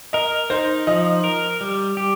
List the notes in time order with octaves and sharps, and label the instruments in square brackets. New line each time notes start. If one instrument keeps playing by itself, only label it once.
[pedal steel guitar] A#4 [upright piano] D#5
[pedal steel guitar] D#4 [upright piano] C5
[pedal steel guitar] F3 [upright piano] D#5
[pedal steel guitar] A#4
G3
G4